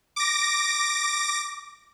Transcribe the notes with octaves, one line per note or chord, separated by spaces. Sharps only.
D6 A#6